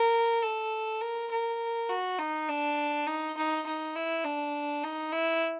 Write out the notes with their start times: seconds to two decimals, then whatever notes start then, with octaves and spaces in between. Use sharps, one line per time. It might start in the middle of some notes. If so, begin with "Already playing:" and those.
Already playing: A#4
0.42 A4
1.01 A#4
1.31 A#4
1.89 F#4
2.18 D#4
2.48 D4
3.07 D#4
3.37 D#4
3.66 D#4
3.95 E4
4.24 D4
4.83 D#4
5.13 E4